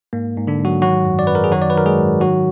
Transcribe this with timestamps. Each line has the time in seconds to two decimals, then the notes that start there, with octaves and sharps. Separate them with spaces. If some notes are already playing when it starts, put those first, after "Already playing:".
0.13 G#2 A#3
0.37 G#2
0.47 D3 D4
0.60 G#2
0.65 F#3 F#4
0.82 D#3 F#3 F#4
1.05 F#2
1.19 D5
1.27 F#2 B4
1.35 A#4
1.44 G#4
1.51 D#3 F#3 F#4
1.62 D5
1.70 B4
1.75 D#3 A#4
1.86 G#3 G#4
1.98 G#2
2.20 D#3 F#3 F#4